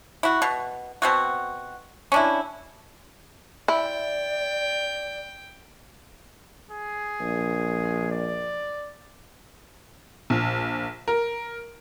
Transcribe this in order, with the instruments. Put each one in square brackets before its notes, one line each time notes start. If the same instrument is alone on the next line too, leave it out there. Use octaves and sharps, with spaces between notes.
[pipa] E4 F#4
B2
B2 C4 F#4
C#4 D4 E4
[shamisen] E4 [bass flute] D5 [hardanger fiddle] G5
[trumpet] G#4
[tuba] A#1
[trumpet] D5
[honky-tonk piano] A#1
A#4